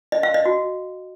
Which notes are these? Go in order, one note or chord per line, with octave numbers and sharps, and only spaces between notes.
D#5
F5
D#5
F#4